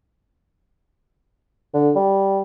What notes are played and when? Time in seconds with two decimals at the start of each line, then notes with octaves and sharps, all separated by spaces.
1.74 D3
1.95 G3